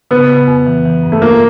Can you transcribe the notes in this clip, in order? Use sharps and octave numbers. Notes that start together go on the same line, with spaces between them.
C#3 B3
C#3
F2
E3
E3
G2
A3
A#3 F4